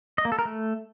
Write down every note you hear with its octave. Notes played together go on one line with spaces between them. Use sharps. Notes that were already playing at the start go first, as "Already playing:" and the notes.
D#5
A#3
A4
A#4
A3